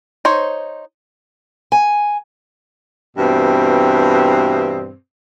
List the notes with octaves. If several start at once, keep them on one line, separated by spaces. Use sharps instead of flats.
D#4 C5 C#5
G#5
G2 B2 E3 C4